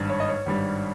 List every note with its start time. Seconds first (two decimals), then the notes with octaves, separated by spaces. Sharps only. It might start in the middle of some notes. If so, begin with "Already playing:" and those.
Already playing: G#1 G2 G3
0.10 C#5
0.20 D#5
0.29 C#5
0.46 G#1 G2 G3